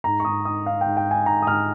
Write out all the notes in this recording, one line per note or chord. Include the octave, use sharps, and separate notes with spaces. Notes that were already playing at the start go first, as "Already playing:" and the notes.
G#2 A#5
C#6
G#2 D#6
D#4 D#6
D#4 F5
G5
G#2
G5
D#4
G#5
G#2 A#5
D#6
G#2 F6